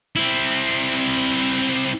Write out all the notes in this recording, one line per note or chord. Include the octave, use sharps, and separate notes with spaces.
C4 E4